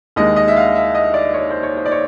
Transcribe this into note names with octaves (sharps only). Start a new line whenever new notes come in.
D#2 D#3 G#3 D#5
D#5
E5
F5
E5
D#5
D5
C#5
C5
C#5
C5
D5
C#5